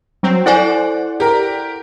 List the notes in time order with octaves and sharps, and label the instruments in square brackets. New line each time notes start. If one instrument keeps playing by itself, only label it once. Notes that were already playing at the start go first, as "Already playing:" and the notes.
[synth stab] F#3 C4
[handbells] E4 A4 G#5 [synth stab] C5 D5 F#5
[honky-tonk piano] G4 A#4